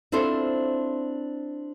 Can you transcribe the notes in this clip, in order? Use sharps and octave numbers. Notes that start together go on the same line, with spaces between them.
C4 D4 E4 F4 A4 C5